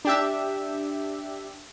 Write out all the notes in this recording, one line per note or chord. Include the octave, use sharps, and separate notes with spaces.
D4 G4 E5